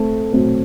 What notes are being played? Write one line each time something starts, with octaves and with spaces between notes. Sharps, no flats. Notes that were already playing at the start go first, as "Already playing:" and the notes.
Already playing: A3 C4
F#3 A3 C4